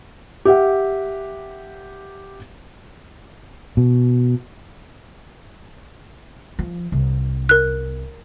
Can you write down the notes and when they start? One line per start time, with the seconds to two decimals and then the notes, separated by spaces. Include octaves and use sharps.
0.45 G4 E5 F#5
3.77 B2
6.59 F3
6.92 C2
7.49 A#4 F#6